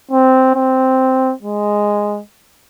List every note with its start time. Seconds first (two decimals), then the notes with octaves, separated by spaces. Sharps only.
0.11 C4
0.55 C4
1.42 G#3